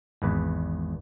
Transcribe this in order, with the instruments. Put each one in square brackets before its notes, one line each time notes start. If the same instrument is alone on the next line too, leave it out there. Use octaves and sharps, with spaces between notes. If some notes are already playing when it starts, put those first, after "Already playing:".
[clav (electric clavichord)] G#1 E2 B4